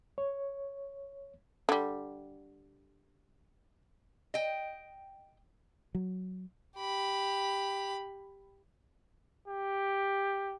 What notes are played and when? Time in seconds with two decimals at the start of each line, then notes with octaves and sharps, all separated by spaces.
0.18 C#5
1.69 D3 G3
4.34 D#5 G5
5.95 F#3
6.78 G4 B5
9.48 G4